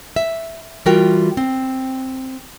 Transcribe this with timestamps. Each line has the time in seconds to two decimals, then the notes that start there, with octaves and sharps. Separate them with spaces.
0.16 E5
0.86 E3 G3 F4 F#4 A#4 G5
1.37 C4